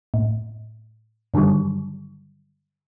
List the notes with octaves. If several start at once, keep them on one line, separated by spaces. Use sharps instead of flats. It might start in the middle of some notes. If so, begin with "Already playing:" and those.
A2
G2 D3 D#3 F#3 G3